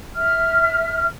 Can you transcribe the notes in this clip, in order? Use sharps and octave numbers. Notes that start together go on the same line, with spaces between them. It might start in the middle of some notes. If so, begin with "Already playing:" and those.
E5 F6